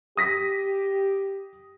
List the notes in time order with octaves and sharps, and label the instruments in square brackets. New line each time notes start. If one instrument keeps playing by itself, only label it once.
[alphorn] G4 [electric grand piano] D#6 A#6 B6